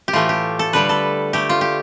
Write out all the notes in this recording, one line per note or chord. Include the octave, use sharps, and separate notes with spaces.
G4
A2 E3 A3 F4
G4
A4
D3 G3 B4
A4
D3 A3 G4
F4
G4